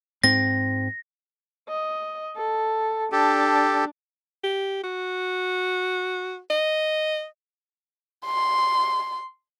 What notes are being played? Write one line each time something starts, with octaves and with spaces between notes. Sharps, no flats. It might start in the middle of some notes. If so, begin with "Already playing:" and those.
G#2 C4 A#6
D#5
A4
D4 G4 A4
G4
F#4
D#5
C6